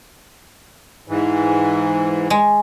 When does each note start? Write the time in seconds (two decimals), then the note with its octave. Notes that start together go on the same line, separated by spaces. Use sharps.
1.08 G#2 E3
2.30 G#3